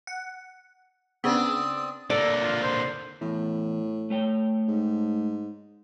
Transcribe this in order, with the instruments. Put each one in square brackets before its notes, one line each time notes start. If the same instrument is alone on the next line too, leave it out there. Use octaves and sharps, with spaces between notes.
[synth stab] F#5
[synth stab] C#3 B3 [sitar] C4 D4 [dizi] D#6 [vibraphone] E6
[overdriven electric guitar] D3 A#3 [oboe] A4 [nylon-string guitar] D5
[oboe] F4
C5
[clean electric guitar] E2 [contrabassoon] A2
[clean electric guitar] A3 C#5 G5
[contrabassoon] G#2